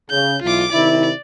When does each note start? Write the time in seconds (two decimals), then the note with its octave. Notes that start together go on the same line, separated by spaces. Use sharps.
0.10 C#3 G6
0.43 B1 E3 F4 D6
0.73 C3 D#3 E4 D5